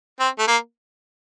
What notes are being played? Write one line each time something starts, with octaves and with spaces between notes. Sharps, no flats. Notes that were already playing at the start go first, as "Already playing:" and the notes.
C4
A3
A#3